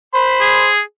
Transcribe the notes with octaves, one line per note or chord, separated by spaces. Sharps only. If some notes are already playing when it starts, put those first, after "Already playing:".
C5 B5
G#4